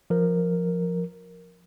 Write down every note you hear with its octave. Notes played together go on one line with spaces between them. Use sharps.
F3 A#4